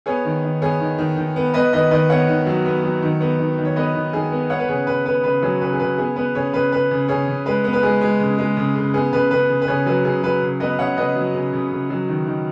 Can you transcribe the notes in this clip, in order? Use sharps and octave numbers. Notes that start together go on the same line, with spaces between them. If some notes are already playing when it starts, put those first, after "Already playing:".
B3 G#4 C#5
D#3
D#3
B3 G#4 C#5
D#3
D#3
D#3
B3
B3 B4 D#5
D#3 B4 D#5
D#3 B4 D#5
B3 C#5 F#5
D#3
F#3
B3
F#3
D#3
B3
D#3
D#3
C#5
B3 B4 D#5
D#3
D#3 G#4
B3
B3 C#5 F#5
B4
C#3 G#4 C#5
C#3 B4
B3 B4
C#3 B4
F#3 G#4 C#5
C#3 B4
G#4
C#3 B4
B3 G#4
B3 B4
C#3 G#4 C#5
C#3 B4
C#3 B4
C#3
C#3 G#4 C#5
C#3
G#3 B4
B3
B4
G#3 G#4
G#3
C#3
G#3
C#3
C#3
B3 G#4
C#3 B4
C#3 B4
C#3
B4
C#3 G#4 C#5
F#3 B4
C#3 G#4
F#3 B4
C#3
B3 B4 D#5
C#3 C#5 F#5
C#3 B4 D#5
F#3
C#3
C#3
C#3
F#3
D#3
D#3